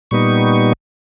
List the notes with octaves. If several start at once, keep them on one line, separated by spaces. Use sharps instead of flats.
A#2 G3 B3 D#4 C#6